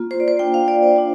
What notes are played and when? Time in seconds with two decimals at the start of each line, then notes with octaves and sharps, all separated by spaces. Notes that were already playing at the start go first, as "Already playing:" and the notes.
Already playing: A#3 F4
0.11 C5
0.20 D5
0.28 C5
0.39 A#3 D4 F4 G5
0.54 F5
0.68 D5
0.83 C5
0.96 D4 F4 C5